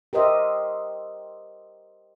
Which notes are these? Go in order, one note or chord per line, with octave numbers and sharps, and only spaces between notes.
G4 A#4 C5 D#5 E5